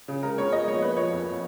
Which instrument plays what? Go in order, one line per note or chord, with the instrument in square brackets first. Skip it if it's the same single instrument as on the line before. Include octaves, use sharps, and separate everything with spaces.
[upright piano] C#3
G#3 A#4
B3 C#5
G#3 D#5
A#1 C#5
A#3 B4
F3 C#5
F2
F3